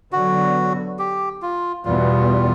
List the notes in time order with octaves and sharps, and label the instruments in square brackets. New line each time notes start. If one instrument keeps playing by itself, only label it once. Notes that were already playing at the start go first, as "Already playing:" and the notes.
[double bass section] D3 F#3 B3 [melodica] F#4
[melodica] G4
F4
[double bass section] E2 B2 G3 B3 [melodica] F4